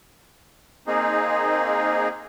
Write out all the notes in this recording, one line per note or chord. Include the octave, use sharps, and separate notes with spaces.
A#3 C4 D#4 G#4